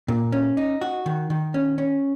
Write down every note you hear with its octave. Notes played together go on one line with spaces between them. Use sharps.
A#2
C#4
D#4
F#4
D#3
D#3
C#4
C#4